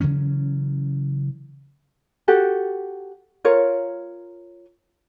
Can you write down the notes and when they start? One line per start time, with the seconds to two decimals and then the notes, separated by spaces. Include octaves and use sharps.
0.01 C#3 E3 F#3 C#4
2.28 F#4 G4 A4
3.45 F4 A#4 C#5